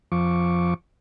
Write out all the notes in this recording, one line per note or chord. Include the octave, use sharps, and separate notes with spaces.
F2 F3 C#6 D6